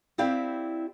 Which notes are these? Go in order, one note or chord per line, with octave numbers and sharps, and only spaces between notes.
C4 E4 G4 D5 F5